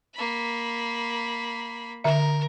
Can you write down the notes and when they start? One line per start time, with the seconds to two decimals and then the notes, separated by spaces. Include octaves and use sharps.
0.14 A#3 B5
2.04 D3 A#4 E5